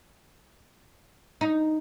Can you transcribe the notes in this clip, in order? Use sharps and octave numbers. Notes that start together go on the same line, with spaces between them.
D#4